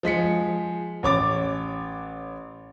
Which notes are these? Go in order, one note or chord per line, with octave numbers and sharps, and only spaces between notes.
F3 G#3 B6 C#7
A1 C#5 D6 A6